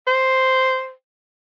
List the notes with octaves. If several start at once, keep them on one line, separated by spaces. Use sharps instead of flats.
C5